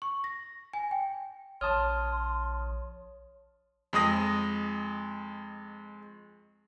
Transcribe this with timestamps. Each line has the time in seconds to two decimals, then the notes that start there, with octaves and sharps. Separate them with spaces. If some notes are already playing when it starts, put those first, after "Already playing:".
0.02 C#6
0.24 A#6
0.74 G#5
0.91 G5
1.61 A#1 C#5 A5 C6 D#6 F6
3.93 F2 G#3 D#6 A#6